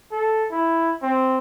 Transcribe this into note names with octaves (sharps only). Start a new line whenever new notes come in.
A4
E4
C4